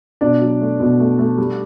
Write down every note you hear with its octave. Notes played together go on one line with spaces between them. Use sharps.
B2 D4 D5
F#3
A3
B2
A3
A3
G3